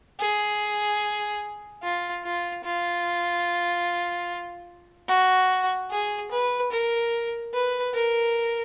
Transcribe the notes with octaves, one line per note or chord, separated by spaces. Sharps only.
G#4
F4
F4
F4
F#4
G#4
B4
A#4
B4
A#4